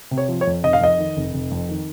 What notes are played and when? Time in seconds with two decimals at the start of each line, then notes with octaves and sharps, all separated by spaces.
0.11 C3
0.18 C#5
0.28 F3
0.41 C#5
0.47 F2
0.63 F1 D#5
0.73 F5
0.81 F2 D#5
0.98 D#3
1.17 F1
1.34 F1
1.51 F2
1.69 D#3